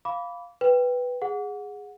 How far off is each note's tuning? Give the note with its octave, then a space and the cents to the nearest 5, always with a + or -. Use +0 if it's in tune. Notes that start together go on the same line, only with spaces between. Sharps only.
F5 +0 B5 +0 D6 -25
B4 +0 G5 +5
G#4 -5 F#5 -20